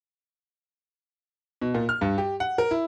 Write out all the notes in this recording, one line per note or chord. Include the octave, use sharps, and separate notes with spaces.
B2
A#2
F6
G2
G4
F#5
A#4
E4